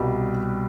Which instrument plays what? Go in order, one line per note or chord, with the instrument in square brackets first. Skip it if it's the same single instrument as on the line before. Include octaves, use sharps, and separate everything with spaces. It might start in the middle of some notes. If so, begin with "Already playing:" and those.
Already playing: [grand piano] C2 B2 G3 G4 B4